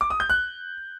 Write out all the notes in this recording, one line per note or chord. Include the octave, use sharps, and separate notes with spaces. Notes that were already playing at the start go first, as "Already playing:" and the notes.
D6
D#6
G6
F#6